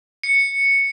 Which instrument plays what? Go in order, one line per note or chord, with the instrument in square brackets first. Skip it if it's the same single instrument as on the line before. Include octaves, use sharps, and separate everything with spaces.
[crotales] C#7